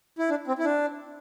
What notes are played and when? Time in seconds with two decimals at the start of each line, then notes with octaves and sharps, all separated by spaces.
0.19 E4
0.30 D4
0.47 C4
0.59 E4
0.65 D4